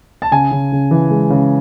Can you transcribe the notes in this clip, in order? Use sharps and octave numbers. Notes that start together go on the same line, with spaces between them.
A5
C#3 G#5
C#3
C#3
E3
G#3
C#3